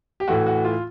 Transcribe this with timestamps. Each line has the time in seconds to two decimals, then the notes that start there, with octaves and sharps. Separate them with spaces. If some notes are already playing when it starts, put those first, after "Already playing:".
0.20 G4
0.28 A2 E3 A3 F#4
0.47 F#4
0.65 F4